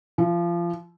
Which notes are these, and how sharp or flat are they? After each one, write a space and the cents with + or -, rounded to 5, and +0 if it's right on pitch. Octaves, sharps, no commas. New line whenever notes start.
F3 -25